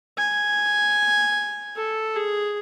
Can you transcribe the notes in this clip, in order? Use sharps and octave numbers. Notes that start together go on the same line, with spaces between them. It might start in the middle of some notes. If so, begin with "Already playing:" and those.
G#5
A4
G#4